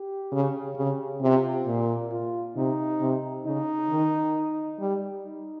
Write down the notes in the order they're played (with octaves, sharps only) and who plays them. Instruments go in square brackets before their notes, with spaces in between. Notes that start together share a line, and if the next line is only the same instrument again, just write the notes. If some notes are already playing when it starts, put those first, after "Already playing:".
Already playing: [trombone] G4
[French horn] C#3
[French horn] C#3 [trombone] G4
[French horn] C3 [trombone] F4
[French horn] A#2
[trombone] F4
[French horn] C3 [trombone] D#4
[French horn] C3
[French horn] C#3 [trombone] D#4
[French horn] D#3
G3
[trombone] D#4